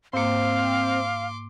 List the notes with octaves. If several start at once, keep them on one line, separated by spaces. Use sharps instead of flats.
G#2 A#3 C4 F5 C6 D6